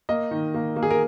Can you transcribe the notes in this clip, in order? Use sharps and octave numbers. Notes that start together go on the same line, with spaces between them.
A#3 D#5
D#3
A#3
A#3
G#4
A#4